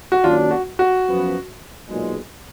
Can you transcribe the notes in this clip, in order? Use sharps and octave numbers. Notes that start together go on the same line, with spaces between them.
F#4
F#2 D#3 F#3 A#3 D4 F4
F#4
F#4
F#2 F3 B3
B1 A#2 G#3